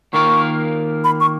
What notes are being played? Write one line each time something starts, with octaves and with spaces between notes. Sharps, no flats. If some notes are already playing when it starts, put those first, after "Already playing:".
D#3 A#3 F4 A#4 C#6
B5
C#6